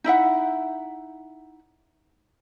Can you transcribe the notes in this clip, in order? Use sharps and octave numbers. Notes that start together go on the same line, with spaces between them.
D#4 E4 E5 F#5